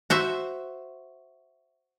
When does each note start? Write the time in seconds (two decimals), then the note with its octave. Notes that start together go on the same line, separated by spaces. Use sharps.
0.10 F#4 C5 E5